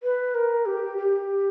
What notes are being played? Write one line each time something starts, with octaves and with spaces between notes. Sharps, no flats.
B4
A#4
G4
G4